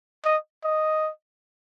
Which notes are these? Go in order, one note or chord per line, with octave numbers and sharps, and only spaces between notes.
D#5
D#5